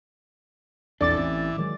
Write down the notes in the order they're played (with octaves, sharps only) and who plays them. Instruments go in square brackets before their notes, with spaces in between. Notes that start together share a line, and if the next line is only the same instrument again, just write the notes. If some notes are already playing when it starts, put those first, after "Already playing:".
[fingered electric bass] A#1 C4 D4 [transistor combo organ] E2 A4 [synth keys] D5 D6 A6
[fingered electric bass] A1 C4 C#4 [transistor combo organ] E3
[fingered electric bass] D#3 F#3 G#3